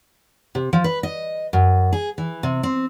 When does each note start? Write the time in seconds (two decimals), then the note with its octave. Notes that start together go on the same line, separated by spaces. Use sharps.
0.55 C3
0.73 F3
0.84 B4
1.03 D#5
1.53 F#2
1.93 G#4
2.18 E3
2.43 C3
2.63 C4